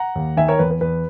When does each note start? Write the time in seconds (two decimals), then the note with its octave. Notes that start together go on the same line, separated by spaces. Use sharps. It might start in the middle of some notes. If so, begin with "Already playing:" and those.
Already playing: F#5 A#5
0.15 D#2
0.37 D#3 E5 G#5
0.48 A#4 C#5
0.59 E2 B4
0.71 B4
0.81 E2 B4